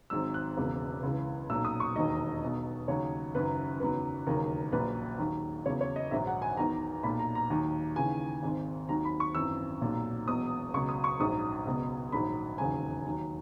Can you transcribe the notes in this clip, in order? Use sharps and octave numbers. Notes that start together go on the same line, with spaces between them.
G#1 G#2 F#3 E6
F#6
E1 E2 C#3 F#3
C#2 C#3 E3
B1 A#2 F#3 E6
D#6
C#6
E1 D#2 D#3 F#3 D#5
B1 B2 F#3
D#2 C#3 F#3 C#5
F#1 F#2 D#3 F#3 B4
F#1 E2 D#3 F#3 B4
E1 D#2 C#3 F#3 A#4
A#1 A#2 F#3 B4
D#2 D#3 F#3
E2 C#3 F#3 C#5
C#5
D#5
A#1 G#2 D#3 F#3 E5
F#5
G#5
E2 D#3 F#3 A#5
B1 A#2 F#3 B5
A#5
A#5
D#2 D#3 F#3
D#2 C#3 E3 G#5
G#1 G#2 D#3
D#2 D#3 F#3 A#5
B5
C#6
G#1 F#2 E3 E6
B1 A#2 F#3
E1 E2 B2 F#3 D#6
C#2 B2 F#3 C#6
D#6
C#6
A#1 G#2 F#3 D#6
C#2 B2 F#3
A#1 G#2 D#3 F#3 B5
E1 D#2 C#3 F#3 G#5
D#2 D#3 F#3